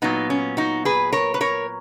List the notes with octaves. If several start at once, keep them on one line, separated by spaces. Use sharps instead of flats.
A#2 F#3 B3 D#4
C#4
D#4 F#4
G#4 B4
A#4 C#5
B4
A#4 C#5